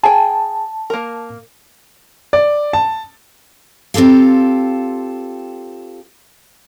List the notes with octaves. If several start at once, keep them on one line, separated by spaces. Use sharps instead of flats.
G#4 G5 A5
A#3 A#4
D5
A5
C4 F4 G4 A4 F5